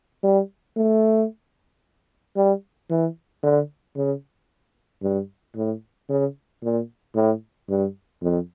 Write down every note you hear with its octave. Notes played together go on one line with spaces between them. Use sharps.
G3
A3
G3
E3
D3
C#3
G2
A2
C#3
A#2
A2
G2
F2